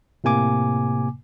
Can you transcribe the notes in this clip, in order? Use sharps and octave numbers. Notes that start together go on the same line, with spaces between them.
A2 C3 A#3 G#5 D6